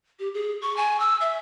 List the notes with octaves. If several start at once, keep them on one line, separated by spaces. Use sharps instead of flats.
G4
G#4
C#6
G#5
E6
E5